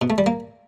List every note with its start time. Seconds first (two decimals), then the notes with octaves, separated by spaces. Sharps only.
0.02 B2
0.10 A3
0.18 G3
0.26 A#3